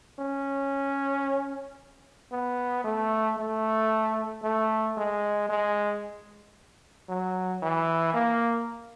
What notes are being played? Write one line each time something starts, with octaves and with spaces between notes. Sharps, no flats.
C#4
B3
A3
A3
A3
G#3
G#3
F#3
E3
A#3